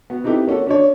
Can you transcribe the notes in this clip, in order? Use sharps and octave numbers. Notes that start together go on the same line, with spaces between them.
B3 F#4
C4 D#4 E4 G4 A4 B4
A#3 C#4 F#4 A4
C#4 D4 C#5